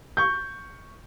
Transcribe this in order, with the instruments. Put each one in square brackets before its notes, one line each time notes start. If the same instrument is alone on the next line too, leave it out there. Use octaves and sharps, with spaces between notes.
[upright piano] C#6 G6